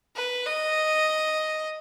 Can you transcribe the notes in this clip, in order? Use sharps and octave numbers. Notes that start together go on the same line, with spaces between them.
B4
D#5